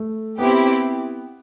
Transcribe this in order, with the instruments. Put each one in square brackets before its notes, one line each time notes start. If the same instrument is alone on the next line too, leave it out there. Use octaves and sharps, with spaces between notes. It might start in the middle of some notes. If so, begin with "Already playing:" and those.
Already playing: [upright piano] A3
[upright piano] B3 [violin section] C4 E4 G4